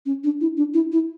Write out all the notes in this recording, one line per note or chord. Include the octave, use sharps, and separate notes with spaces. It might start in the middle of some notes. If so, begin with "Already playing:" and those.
C#4
D4
E4
D4
E4
E4